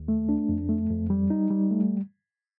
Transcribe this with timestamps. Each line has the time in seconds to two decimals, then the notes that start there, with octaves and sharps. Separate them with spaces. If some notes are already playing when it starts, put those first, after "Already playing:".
Already playing: D#2
0.08 A3
0.29 D4
0.49 F2
0.69 A3
0.90 F2
1.10 G3
1.30 D#4
1.51 G3
1.71 A3